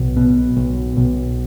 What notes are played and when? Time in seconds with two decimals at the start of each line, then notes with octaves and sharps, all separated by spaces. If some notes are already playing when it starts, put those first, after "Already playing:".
Already playing: B1
0.17 B2
0.56 B1
0.97 B1